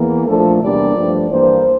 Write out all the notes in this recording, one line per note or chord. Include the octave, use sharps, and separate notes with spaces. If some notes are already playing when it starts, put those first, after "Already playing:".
Already playing: E2 E3 A#3
A#2 F3 A3 D4 A4
E2 C3 G3 A#3 D4 D5
G2 F3 A3 D4
G2 E3 A#3 D4 C5